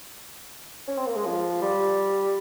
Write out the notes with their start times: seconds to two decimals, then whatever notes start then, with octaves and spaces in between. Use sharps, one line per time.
0.88 C#4
0.97 C4
1.06 A#3
1.16 G#3
1.25 F3
1.62 G3